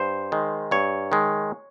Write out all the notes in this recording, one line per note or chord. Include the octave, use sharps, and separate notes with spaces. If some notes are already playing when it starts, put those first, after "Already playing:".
Already playing: G2 C5
D#3 G#3
G2 C#5
D#3 G#3